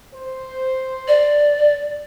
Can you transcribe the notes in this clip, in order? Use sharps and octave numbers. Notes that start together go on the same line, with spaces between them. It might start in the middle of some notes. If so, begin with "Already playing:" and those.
C5
D5